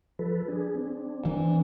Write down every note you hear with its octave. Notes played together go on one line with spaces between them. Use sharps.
F3 A4 B4
D4 G#4
C4 D4
E3